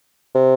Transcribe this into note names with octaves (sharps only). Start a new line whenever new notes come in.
C3